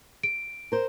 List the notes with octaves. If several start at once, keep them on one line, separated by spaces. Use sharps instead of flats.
D7
A#4 C5